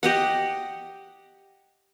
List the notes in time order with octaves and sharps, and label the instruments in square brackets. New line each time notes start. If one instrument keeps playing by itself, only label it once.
[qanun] G4 D#5 F#5